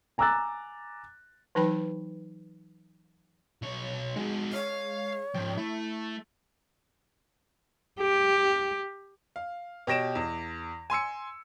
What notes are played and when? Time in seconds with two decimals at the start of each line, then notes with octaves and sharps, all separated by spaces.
0.18 G#5 A#5 D6 E6 F#6 A6
1.55 E3 F#3 D#4 B4 G5 B5
3.62 B1 C#5
4.16 G#3 D#4 F#4
4.53 C#5 F5
5.35 G#2 F3 G5
5.57 A3 E4
8.01 G4
9.36 F5
9.87 B2 G4 C#5 A#6 D7 E7
10.15 E2
10.90 G#5 C6 E6 C#7